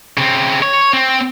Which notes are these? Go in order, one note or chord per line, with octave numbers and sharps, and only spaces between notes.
C#3 C4
C#5
C4